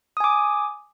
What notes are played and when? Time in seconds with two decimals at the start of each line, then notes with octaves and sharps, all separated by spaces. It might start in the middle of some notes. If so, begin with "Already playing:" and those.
0.17 D#6
0.20 G#5
0.24 D6